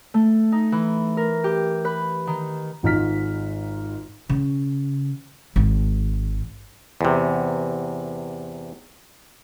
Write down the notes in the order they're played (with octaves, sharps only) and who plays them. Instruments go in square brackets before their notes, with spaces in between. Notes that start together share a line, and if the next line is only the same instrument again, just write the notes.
[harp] A3
D#4
E3
A#4
G4
B4
D#3
[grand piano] G#1 G#2 D#4 F4 F6 B6
[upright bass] C#3
G#1
[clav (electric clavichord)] E2 C3